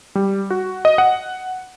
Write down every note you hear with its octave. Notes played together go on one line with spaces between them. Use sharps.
G3
F#4
D#5
F#5